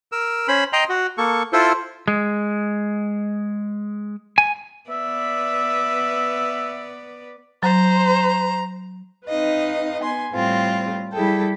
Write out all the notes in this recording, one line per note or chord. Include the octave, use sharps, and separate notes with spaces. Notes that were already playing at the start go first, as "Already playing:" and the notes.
A#4 E6
C#4 C5 B5
D#5 G5 A#5 C6
F#4
A#3 A4 C#6
E4 F4 A4 C5
G#3
G#5
B3 B4 D5 E5
F#3 C5 A#5
C4 D#4 B4 D#5 F5
B3 G#5 C6
A2 G3 A3 C4 F4
G3 E4 G#4 A4 G5